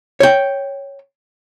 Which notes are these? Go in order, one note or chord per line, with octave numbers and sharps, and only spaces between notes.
C#5 G5